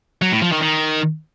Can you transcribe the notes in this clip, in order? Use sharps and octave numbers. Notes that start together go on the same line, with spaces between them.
F#3
A2
F3
D#3
D#3